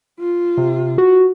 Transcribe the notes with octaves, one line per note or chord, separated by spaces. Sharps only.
F4
C3
F#4